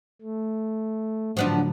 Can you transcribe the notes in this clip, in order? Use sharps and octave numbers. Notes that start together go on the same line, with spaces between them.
A3
A2 D3 F3 F#3 B3 D4